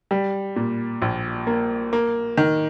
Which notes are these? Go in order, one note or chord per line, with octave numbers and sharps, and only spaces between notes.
G3
A#2
A#1
A#3
A#3
D#3